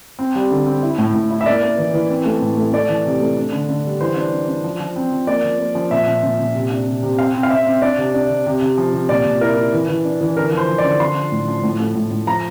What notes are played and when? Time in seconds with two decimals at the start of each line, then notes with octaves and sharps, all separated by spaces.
0.19 C4
0.35 G3
0.51 D3
0.66 C4
0.83 E4
0.98 A2
1.14 A2
1.31 E4
1.41 E5
1.46 A#3 D5
1.63 A#3
1.78 E3
1.94 E3
2.10 C4
2.26 A3
2.41 A2
2.57 A3
2.73 A3 D5
2.89 E3
3.06 C3
3.20 A3
3.37 D4
3.52 D3
3.69 D3
3.85 G3
4.01 E3 C5
4.17 D4
4.33 D4
4.48 D4
4.64 F3
4.80 F3
4.96 C4
5.12 F3
5.27 A#3 D5
5.44 F3
5.60 A#3
5.75 F3
5.91 A#2 E5
6.07 A#2
6.23 A#2
6.39 A#2
6.55 C3
6.71 D4
6.87 C3
7.03 C3
7.18 C4 F5
7.34 C4
7.43 F5
7.50 C4 E5
7.66 C4
7.82 D4 D5
7.98 C3
8.14 D4
8.30 C3
8.46 C3
8.62 C3
8.78 F3
8.93 C3
9.09 A#2 D5
9.25 A#2
9.41 E4 A#4
9.57 E4
9.73 E3
9.89 E3
10.05 D4
10.21 E3
10.36 D3 A#4
10.52 F3
10.57 C5
10.69 F3
10.78 D5
10.84 D3
11.00 D4 C6
11.16 F3
11.32 A2
11.48 F3
11.64 A2
11.80 A3
11.95 A2
12.11 A2
12.27 F3 A#5